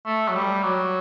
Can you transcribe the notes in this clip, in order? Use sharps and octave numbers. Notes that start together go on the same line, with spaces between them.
A3
F#3
G3
F#3